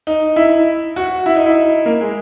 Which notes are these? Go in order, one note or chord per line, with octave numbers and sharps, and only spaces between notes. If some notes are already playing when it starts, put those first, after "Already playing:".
D#4
E4
F#4
E4
D#4
E4
A#3
G#3